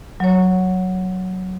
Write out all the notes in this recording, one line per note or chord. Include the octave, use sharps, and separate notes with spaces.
F#3 C#5